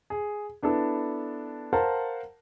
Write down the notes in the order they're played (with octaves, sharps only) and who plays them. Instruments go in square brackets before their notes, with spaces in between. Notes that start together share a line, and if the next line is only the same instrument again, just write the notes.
[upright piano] G#4
B3 D4 E4 A4
A#4 C5 F5 F#5 A5